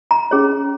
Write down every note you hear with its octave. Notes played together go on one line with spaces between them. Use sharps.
A#5
C#4 G#4 C#5